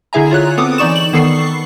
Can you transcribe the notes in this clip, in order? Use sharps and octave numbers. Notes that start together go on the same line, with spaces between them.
D3 E4 G#4 E5 G#5 A#5
F4 C#5 F#6
B3 C4 A4 D6 D#6
E3 D#4 D5 C#6 E7
F#7
D#3 B3 A4 C#6 C7